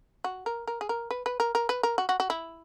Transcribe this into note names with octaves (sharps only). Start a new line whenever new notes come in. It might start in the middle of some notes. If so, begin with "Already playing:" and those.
F#4
A#4
A#4
G#4
A#4
B4
B4
A#4
A#4
B4
A#4
F#4
F#4
F#4
E4